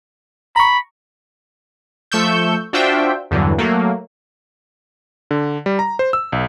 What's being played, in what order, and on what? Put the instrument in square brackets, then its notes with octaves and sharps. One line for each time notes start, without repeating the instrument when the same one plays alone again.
[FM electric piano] A#5 C#6 [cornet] B5
[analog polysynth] F3 A3 C#6 E6 G6
D4 F4 F#4 C5 E5 G5
E2 G2 D3 E3 F#3
F#3 A3 A#3
[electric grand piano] D3
G3
A#5
C5
E6
B1